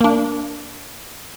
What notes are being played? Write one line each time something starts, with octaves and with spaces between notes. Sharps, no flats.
A#3 D4